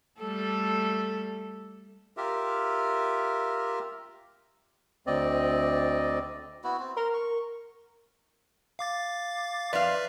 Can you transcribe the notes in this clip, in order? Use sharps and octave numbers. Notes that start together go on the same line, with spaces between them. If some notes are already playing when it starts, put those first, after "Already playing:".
G3 A3 A4
F4 G4 A#4 E5
D2 C4 D5 D#5
B3 E4 F#4
C4
A#4 C6
C#6
F5 D6 A6
F2 B4 D5 E5 F5